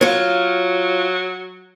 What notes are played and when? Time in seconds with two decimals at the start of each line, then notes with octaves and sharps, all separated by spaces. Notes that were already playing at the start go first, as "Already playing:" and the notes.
0.01 F#3 F4 C#5